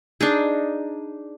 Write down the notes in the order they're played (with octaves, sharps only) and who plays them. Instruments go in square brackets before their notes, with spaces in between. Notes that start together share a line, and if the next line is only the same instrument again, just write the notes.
[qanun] D4 D#4 G#4